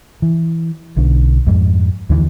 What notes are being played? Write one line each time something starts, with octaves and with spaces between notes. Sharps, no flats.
E3
B1 D3
F2 G#2
D#2 D3 E3